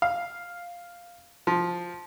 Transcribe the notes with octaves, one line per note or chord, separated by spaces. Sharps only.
F5
F3